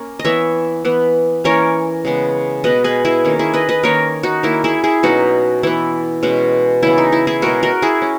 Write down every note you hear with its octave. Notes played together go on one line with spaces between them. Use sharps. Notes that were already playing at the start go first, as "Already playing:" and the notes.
Already playing: A#3 C#4
D#5
E3 B3 C#5 E5
E3 B3
E3 A#3 C#4 A#4 C#5
C#3 G#3 B3
B2 G#3 B3 B4 D#5
G#4 B4
E4 G#4
D#3 A#3 C#4
E4 G#4
B4 D#5
B4 D#5
D#3 A#3 C#4 A#4 C#5
D#4 F#4
D#3 A#3 C#4 E4
E4 G#4
E4 G#4
B2 F#3 C#4 D#4 F#4
E3 B3 E4
B2 G#3 C#4
C#3 E3 B3 E4
D#4
E4
E4 G#4
B2 G#3 C#4 F#4 A#4
F#4 A#4
E4 G#4
C#4